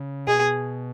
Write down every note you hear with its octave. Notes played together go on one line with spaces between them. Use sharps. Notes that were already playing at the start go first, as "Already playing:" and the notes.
Already playing: C#3
B2 G#4